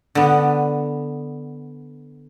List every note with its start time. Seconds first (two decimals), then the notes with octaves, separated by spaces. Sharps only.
0.15 D3 B3